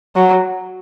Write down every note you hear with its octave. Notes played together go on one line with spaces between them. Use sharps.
F#3